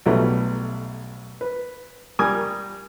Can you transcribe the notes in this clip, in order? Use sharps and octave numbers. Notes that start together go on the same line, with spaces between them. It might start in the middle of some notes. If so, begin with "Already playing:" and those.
B1 F#3 G3 A3 B3
B4
G3 A#4 G#5 D#6